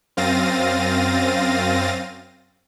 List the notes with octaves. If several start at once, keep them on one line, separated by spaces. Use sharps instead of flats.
F#2 C4 F5 A6 A#6 D#7